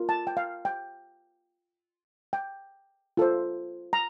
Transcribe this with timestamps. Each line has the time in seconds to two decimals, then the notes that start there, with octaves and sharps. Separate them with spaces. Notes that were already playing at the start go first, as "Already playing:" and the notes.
Already playing: F4 A#4
0.09 A5
0.27 G5
0.37 F5
0.65 G5
2.33 G5
3.17 F4 A4 C5
3.93 A#5